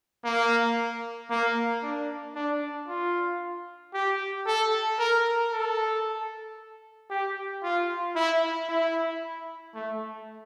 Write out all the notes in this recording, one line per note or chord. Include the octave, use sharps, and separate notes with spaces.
A#3
A#3
D4
D4
F4
G4
A4
A#4
A4
G4
F4
E4
E4
A3